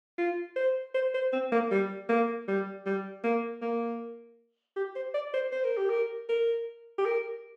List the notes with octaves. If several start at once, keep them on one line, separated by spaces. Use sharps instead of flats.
F4
C5
C5
C5
C4
A#3
G3
A#3
G3
G3
A#3
A#3
G4
C5
D5
C5
C5
A#4
G4
A#4
A#4
G4
A#4